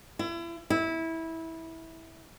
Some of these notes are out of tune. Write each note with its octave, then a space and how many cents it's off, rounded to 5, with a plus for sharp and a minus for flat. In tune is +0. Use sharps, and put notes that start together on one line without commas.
E4 +35
E4 -15